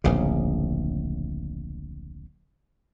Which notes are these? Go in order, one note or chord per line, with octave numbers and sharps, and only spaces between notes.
D1 A#1 C#3